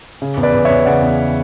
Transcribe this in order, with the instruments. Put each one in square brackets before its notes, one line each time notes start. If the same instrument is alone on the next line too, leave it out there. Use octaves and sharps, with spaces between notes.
[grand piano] C#3
E2
B4 D5
E2
C#5 E5
E2
C#3 D5 F#5
E2